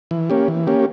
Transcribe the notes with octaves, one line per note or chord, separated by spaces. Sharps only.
E3
A#3 C#4 G4
E3
A#3 C#4 G4